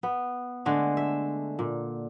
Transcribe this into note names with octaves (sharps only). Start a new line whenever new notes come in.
B3
D3 G#3 A3 D4
E5
A#2